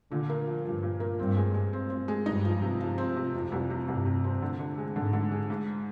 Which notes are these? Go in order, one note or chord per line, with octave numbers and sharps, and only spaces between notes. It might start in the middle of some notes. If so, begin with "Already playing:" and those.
A#2 D3
A#3
F3
G2 F3
A#2
A#3
G2 C4
G#3
G#3
C4
C4
G#3
G2 D#4
F3
C3
F3
C4
C3
F2 F3
C2
C3
C2 G2
C3
C4
D3
D3
G#3
G#2 D3
D3
G#3
G#2